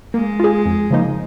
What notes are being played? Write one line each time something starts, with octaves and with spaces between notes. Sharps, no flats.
G#3 A#3
F4 G#4
F2
C#3 F3 A#3 D#4